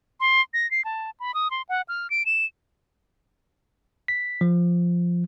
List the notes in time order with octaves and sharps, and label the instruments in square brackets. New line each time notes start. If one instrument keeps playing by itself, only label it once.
[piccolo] C6
A#6
C7
A5
B5
D#6
C6
F#5
F6
D7
E7
[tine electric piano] B6
F3